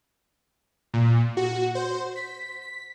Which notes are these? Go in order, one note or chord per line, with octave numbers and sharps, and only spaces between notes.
A#2
F#4
C5
B6
B6